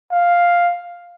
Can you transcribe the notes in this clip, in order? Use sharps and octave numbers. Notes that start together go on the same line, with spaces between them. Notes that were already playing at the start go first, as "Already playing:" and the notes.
F5